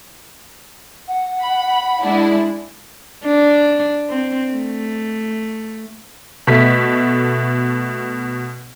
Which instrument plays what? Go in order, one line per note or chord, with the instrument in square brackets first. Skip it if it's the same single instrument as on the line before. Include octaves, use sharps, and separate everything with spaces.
[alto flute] F#5
[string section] B5
G#3 D4 E4
[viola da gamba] D4
C4
A3
[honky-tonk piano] B2 A3 B6